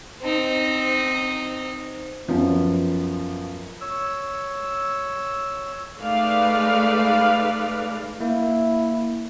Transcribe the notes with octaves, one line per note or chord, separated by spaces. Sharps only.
C4 D#4
F#2 F3 B3
C#5 E6
G#3 A3 D#4 B4 D5 F5
A#3 E4